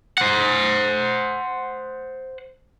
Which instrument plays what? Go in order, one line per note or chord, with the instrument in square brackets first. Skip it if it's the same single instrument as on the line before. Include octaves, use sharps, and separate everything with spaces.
[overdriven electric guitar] C5 F#5